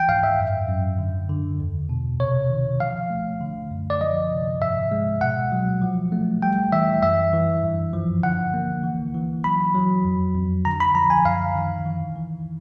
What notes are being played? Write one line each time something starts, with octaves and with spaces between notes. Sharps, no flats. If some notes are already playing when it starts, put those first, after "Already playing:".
Already playing: E3 G5
G#2 F5
E5
F#2
F#2
D3
D3
E2
B2
C3 C#5
D#3
F3 F5
A3
D3
F#2
D5
F3 D#5
C3
G#2 E5
G#3
B2 F#5
F#3
F3
A3
G3 G5
E3 E5
F#2 E5
E3
G2
F3
D3 F#5
A#3
E3
E3
F#3 B5
F#3
F2
F2
D3 A#5
B5
F3 A#5
G#5
F#2 F5
D#3
E3
E3